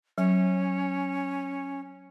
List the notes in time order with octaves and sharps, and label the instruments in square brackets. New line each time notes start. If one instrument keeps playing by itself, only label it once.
[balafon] F#3 [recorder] C#4